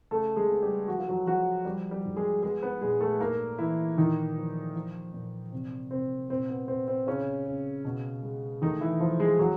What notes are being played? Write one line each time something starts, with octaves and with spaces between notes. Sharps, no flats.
C#3 A3 A4
G#3 G#4
B3
G3 G4
F3 F#4
F4
F#3 F#4
F3 F#3 F#4
F3 G3 G4
G3 G4
G#2
G#3 G#4
G#3 B3 G#4
B3 B4
A#2 G#3 G#4
A3 A4
G#2 A#3 A#4
E3 E4
A#2 D#3 D#4
F3
F3
A#2
C3
C3 C4
A#2 C4
B3
A#2 C4
C4
C#3 C#4
C#3
B2
G#3
D#3 A3 D#4
E3 E4
F3 F4
G#3 G#4
C#3 F#3 F#4